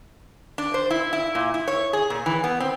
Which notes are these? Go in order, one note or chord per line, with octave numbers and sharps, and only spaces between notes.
D4
C5
E4
E4
A#2
E4
C#5
G#4
A#2
E3
B3
C4